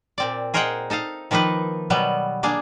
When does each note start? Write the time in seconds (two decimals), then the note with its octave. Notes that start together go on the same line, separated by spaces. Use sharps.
0.18 A#2 C4 D5
0.54 G#4 A#4 C5 D#5 F#5 G5
0.90 D#4 A4 D#5 F5
1.31 D#3 F3 A#3 D#4 B4
1.90 B2 F#3 G3 B3
2.43 A#3 D4 G#4